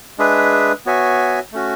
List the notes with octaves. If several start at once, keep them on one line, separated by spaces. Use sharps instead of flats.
G#3 D4 G#4 B4 E5
B3 F#4 C#5 E5 G#5
A3 C#4 F#4